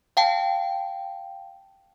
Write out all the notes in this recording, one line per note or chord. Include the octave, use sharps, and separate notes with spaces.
F5 G5 A5